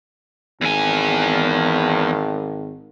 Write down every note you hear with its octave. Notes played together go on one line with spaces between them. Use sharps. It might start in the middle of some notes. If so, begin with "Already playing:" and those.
G#1 E2 G#5